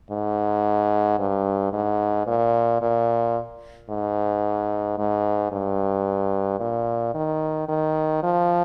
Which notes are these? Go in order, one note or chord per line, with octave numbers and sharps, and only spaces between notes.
G#2
G2
G#2
A#2
A#2
G#2
G#2
G2
A#2
D#3
D#3
F3